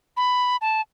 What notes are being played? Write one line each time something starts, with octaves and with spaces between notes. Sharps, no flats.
B5
A5